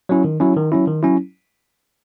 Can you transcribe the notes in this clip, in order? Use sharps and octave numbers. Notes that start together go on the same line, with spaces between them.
F#3 C#4 E4
D#3
F#3 C#4 E4
D#3
F#3 C#4 E4
D#3
F#3 C#4 E4